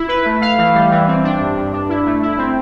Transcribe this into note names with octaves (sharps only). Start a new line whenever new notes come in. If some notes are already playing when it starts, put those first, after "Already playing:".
Already playing: E4
B4
A3
F5
E3
G3
E3
C4
D4
G2
G2
D4
E4
A3
E4
C4